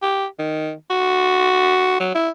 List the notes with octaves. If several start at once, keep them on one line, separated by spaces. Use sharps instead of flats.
G4
D#3
F#4
F#3
E4